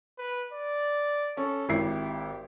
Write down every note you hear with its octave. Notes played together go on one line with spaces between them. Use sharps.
B4
D5
C#4 A4
G#1 E4 G4 C7